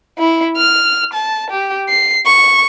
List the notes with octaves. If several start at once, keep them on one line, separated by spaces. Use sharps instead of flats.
E4
F6
A5
G4
C7
C#6